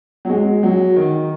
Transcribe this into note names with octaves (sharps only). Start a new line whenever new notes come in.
F#3
G#3
F#3
D#3